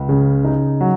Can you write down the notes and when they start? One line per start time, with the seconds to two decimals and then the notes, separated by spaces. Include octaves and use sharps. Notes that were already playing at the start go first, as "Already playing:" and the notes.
Already playing: C#2
0.09 C#3
0.44 D#4
0.81 F#3